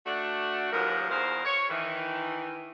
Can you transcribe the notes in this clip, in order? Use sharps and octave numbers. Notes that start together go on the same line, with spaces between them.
A3 D4 F#4
D#2 G#2 B2 F3 F#3 A#4
E2 B2 G#4 A#4 C5 F5
C#5
D#3 E3